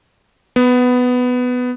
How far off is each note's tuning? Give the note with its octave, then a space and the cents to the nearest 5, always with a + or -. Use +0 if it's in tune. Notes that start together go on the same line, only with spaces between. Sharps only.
B3 +10